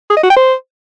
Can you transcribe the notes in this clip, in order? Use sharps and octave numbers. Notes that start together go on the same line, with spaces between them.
G#4
D#5
F#4
G5
C5